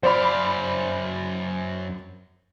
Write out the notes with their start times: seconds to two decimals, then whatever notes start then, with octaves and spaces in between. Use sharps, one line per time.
0.03 F#2 C5 D5 F5 B5